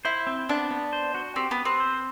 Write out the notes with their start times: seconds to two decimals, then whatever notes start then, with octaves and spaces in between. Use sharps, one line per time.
0.05 E4 C5
0.27 C4
0.49 B3 D4
0.71 B3
0.93 C5
1.15 F#4
1.36 C4 G4
1.51 B3
1.58 B4
1.65 C4
1.80 C5